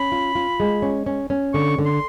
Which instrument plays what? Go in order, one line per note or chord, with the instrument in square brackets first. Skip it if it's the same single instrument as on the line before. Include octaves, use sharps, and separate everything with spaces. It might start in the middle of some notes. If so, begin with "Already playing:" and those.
Already playing: [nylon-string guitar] C#4 [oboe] B5
[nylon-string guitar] F4
F4
G#3
C#4
C#4
C#4
[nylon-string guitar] D3 [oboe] C#6
[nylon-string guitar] D3
[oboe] C6